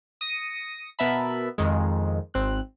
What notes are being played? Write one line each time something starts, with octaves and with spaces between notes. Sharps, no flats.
D#6 A#6 C#7 D#7
B2 B3 A#4 E5 A5 B5
F2 D#3 G#3
G#1 C4 F#6